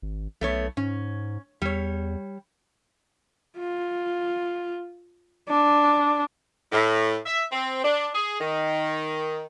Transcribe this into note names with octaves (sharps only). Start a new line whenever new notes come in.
G#1
B1 A3 B3 C#5
G#2 C#4
E2 G3 C#5
F4
D4
A2
E5
C4
D4
G#4
D#3